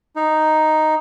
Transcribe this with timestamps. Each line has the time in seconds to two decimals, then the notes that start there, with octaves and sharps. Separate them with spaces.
0.16 D#4